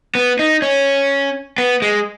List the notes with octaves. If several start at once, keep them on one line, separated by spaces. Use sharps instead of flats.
B3
D#4
C#4
B3
G#3